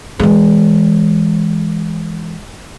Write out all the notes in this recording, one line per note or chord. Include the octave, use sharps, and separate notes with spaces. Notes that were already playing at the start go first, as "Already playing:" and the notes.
E3 G#3